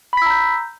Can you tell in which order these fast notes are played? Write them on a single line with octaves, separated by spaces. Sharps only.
B5 B6 E6 A#5 G6